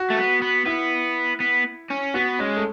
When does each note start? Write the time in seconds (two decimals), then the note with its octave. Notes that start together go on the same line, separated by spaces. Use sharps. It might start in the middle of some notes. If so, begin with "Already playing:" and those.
Already playing: F#4
0.10 A3
0.17 B3
0.42 B3
0.66 B3 E4
1.40 B3
1.90 C#4
2.14 B3 F#4
2.39 G#3 C#4
2.57 A3